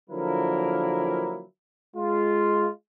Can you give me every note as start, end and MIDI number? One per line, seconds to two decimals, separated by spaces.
0.10 1.44 50
0.10 1.44 53
0.10 1.44 54
0.10 1.44 58
0.10 1.44 64
0.10 1.44 70
1.96 2.69 56
1.96 2.69 65